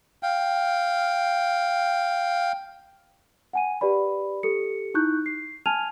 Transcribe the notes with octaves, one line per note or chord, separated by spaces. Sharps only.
F5 G5
F#5 G#5 D#7
G4 B4 D5 B5
G4 A4 C#7
D#4 E4 C#6 F#6 G6
C7
G#5 A5 F6 G#6 D#7 F7